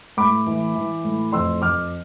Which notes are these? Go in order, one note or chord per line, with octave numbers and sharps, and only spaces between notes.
A2 B5 D6
E3
E3
A2
F2 C6 E6
F2 D6 F6